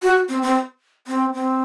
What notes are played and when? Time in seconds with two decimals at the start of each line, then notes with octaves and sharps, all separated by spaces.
0.03 F#4
0.29 C4
0.42 C4
1.07 C4
1.34 C4